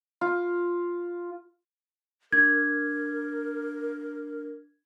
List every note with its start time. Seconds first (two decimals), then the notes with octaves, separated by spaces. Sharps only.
0.21 F4
2.32 D4 A#4 G#6